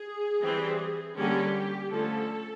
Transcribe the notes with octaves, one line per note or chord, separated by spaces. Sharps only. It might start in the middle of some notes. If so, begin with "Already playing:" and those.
Already playing: G#4
E3 G3 C4
D3 G3 A#3 C#4 G4
D3 F3 A3 C#4 A4